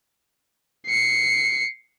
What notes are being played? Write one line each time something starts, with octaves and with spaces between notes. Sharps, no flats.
C7 C#7